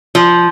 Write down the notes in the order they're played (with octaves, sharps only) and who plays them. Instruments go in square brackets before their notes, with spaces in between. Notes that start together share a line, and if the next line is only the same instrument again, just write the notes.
[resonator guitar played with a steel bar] F3